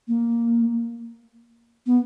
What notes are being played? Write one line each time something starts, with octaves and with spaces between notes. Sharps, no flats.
A#3
B3